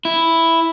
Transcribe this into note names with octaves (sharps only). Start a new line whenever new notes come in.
E4